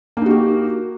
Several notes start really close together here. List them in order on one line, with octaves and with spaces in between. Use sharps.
A#3 D#4 F#4 G4